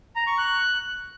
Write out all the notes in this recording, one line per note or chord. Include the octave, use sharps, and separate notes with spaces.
A#5
C#6
F#6